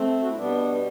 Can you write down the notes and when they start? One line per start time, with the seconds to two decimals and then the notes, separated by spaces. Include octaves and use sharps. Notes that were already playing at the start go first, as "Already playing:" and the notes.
Already playing: A3 C4
0.21 F#4
0.28 E4
0.35 B2 G3 B3 D4